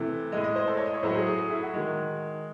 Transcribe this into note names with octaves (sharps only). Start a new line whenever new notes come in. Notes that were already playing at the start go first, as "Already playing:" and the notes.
Already playing: C3 E3 A3
A2 G#3 D#5
D#5
C5
A4
C#5
D#5
C#5
A2 F#3 A3 C5
G#4
G#4
G#4
E4
F#4
D#3 G#3